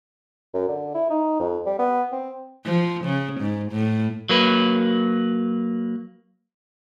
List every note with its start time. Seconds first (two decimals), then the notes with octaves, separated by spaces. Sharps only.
0.54 F#2
0.68 D3
0.95 E4
1.10 D#4
1.40 F2
1.66 G3
1.79 B3
2.12 C4
2.65 F3
3.05 C#3
3.40 G#2
3.72 A2
4.29 F#3 A#3 B4